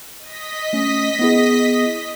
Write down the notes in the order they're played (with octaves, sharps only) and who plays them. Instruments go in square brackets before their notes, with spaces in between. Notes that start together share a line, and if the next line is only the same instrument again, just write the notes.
[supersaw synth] D#5 B6
[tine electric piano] A3 C#4
B3 E4 G#4